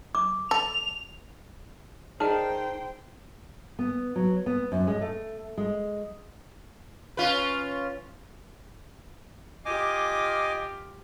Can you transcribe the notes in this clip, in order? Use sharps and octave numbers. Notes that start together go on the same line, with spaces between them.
D6
A4 F7
D#4 G#4 A#4 C5 D5 G5 A5
B3
F#3
B3
F#2
G#3
A3
G#3
C#4 F4 B4
F4 G4 D#5 G#5 D6